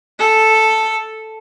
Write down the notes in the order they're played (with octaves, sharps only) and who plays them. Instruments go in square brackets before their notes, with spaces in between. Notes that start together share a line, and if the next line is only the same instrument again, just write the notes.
[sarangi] A4